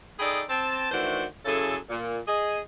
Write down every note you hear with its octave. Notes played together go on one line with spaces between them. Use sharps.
D#4 G#4 A4 D5 G5 B5
C4 A5
D#3 E3 A3 D4 F#4 C5
F#2 C#3 E4 G#4 A4
A#2
G#4 D#5